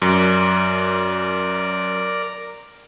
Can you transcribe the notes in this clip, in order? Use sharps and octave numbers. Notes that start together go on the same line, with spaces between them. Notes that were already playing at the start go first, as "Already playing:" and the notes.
F#2 A#4 D5